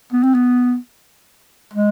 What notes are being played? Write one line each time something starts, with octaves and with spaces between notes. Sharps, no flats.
B3
C4
B3
G#3